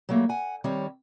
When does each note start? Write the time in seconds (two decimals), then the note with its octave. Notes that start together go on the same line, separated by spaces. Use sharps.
0.09 F#3 G3 A3 A#3
0.29 F#5 G#5
0.64 D#3 G3 C4 C#5